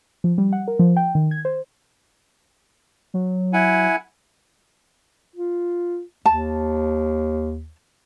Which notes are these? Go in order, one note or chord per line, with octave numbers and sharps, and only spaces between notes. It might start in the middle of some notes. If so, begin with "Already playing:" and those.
F3
G3
F#5
A#4
F3
G5
D#3
G#6
C5
F#3
E4 F#5 G#5
F4
D#2 A5